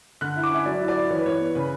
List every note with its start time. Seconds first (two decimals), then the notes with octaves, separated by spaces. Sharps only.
0.21 D3 F#6
0.36 E4
0.43 D6
0.50 C#4 E5
0.65 F#3 D5
0.81 E4
0.88 D5
0.96 E4
1.10 E3 C#5
1.18 B4
1.26 E3 C#5
1.40 B3
1.55 C#3 B4